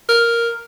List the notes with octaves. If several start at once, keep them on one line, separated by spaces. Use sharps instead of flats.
A#4